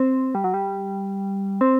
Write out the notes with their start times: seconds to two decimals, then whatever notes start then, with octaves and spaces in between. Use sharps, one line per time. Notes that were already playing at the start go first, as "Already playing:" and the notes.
Already playing: C4
0.35 G3
0.44 F#3
0.54 G3
1.61 C4